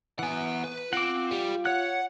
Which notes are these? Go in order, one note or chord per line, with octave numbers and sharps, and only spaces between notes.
E3 B3 F#5 G#5
B4
C4 F4 F#5 D6
G3 G4
C#5 F#5 F#6